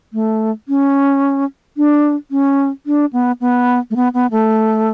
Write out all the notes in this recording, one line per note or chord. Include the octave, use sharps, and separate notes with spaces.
A3
C#4
D4
C#4
D4
B3
B3
A3
B3
B3
A3